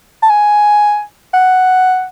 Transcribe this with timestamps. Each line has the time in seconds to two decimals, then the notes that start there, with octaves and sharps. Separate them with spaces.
0.23 A5
0.30 G#5
1.34 F#5